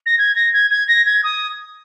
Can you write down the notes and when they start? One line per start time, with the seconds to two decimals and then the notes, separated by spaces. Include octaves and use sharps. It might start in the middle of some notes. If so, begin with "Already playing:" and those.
0.06 A#6
0.18 G#6
0.36 A#6
0.53 G#6
0.71 G#6
0.88 A#6
1.06 G#6
1.24 D#6